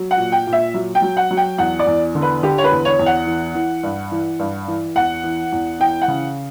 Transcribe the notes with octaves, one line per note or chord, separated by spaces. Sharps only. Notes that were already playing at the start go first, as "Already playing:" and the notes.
Already playing: F#3
F#5
A#2
G5
A#2
E5
F#3
G5
F#3
F#5
F#3
G5
E2 F#5
D5
E2
D3
B4
D3 G4
C#5
B4
E2
C#5
E2
F#5
E3
E3
G2
E3
G2
E3
E2 F#5
E3
E2
E3 G5
F#5
C#3